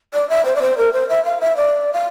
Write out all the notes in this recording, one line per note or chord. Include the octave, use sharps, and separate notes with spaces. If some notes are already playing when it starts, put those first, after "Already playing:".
D5
E5
C5
D5
C5
A#4
C5
E5
F5
E5
D5
F5